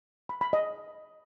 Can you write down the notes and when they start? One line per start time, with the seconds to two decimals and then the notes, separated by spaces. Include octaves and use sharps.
0.29 B5
0.41 B5
0.53 D#5